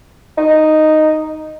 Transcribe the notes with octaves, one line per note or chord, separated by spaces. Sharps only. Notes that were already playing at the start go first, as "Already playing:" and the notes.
D#4